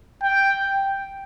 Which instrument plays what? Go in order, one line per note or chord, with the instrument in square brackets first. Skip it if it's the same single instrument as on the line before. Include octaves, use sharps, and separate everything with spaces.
[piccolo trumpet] G5